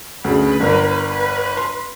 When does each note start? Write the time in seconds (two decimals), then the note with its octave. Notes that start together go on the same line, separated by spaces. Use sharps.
0.24 D2 C#3 B4
0.60 G1 A#4
1.08 B4
1.57 C6